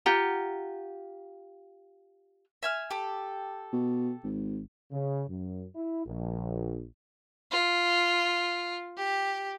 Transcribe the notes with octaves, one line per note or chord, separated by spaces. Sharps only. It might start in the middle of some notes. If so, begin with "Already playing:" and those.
F4 G4 F#5 A#5
E5 G#5 F6
G4 A4
B2
G#1
C#3
F#2
E4
A#1
F4
G4